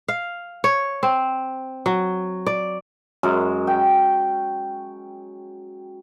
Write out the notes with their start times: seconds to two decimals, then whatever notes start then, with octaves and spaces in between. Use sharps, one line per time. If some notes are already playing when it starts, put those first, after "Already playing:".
0.08 F5
0.64 C#5
1.03 C4
1.86 F#3
2.47 D5
3.23 F#2 G#3
3.67 G5